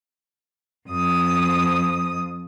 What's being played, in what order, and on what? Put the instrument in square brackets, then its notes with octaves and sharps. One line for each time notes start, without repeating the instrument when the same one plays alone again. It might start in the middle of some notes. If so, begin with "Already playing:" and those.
[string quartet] F2 D#6